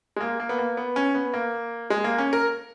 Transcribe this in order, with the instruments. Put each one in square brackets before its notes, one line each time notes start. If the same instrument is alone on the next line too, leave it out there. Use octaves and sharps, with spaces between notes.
[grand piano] G#3
A#3
A#3
B3
A#3
B3
C#4
B3
A#3
G#3
A#3
C#4
A#4